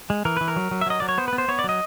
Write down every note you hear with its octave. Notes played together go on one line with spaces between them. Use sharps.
G#3
E3 A#4
E3 B4
A#4
F#3
F#3
E5
F#3 D#5
F#3 D5
C#5
B3 C5
B3 B4
C5
B3 C#5
D5
F#3 D#5